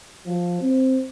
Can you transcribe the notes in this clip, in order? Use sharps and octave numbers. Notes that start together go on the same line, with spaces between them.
F3
C4